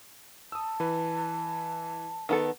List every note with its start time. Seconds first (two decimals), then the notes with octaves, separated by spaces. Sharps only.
0.52 A5 D#6 E6
0.80 E3 B4
2.29 D#3 B3 A4